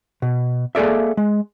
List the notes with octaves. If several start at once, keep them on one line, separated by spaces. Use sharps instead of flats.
B2
A#3 G#4 A4 D5 E5
G#3